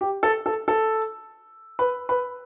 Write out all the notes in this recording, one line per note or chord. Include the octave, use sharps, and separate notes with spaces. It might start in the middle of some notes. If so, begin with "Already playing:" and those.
G4
A4
A4
A4
B4
B4